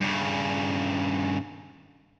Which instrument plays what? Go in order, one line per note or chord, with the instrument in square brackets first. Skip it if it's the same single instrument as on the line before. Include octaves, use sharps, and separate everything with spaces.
[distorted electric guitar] G2 C#3